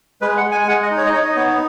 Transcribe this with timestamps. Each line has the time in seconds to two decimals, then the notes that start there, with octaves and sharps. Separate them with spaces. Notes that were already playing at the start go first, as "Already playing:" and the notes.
0.21 G#3 B4
0.37 F#5
0.44 G#3
0.51 G#5
0.62 G#5
0.67 G#3 F#5
0.83 D#5
0.91 D#4
0.97 C#5
1.06 D#5
1.13 D#4 C#5
1.25 D#5
1.36 B3 C#5